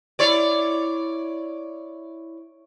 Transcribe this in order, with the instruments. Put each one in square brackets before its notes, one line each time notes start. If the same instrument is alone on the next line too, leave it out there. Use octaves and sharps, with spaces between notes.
[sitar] E4 C#5 D5